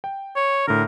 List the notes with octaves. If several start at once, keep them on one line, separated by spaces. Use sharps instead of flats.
G5
C#5
A2 D3 A#4